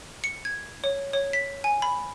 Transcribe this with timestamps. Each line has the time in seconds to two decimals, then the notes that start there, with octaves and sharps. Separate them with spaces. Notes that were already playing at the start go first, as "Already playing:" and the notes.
0.24 C#7
0.45 G#6
0.84 C#5
1.13 C#5
1.33 B6
1.64 G#5
1.82 B5